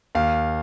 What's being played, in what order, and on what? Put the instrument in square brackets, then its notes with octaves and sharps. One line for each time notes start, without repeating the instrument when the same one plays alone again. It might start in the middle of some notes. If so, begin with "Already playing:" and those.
[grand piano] D#2 F5